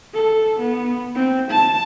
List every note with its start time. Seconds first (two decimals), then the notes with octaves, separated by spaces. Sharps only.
0.14 A4
0.59 B3
1.15 C4
1.51 A5